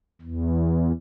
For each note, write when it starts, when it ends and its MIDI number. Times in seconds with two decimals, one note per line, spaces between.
0.21 0.92 40